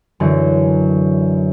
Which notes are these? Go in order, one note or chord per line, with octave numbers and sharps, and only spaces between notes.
F#2 D3 E3